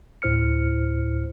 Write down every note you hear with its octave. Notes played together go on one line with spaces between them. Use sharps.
D2 A2 E4 C5 F6 C#7